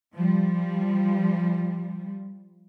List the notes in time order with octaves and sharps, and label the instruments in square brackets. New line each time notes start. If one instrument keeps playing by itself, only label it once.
[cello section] F3 G3